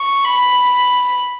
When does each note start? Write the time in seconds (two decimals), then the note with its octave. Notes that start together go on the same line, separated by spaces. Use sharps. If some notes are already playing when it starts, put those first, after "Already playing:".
Already playing: C#6
0.25 B5